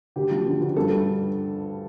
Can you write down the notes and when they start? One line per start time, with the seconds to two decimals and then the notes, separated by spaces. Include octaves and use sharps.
0.16 D2 G4
0.31 F3
0.46 D3
0.61 D2
0.76 G2 A4
0.91 G3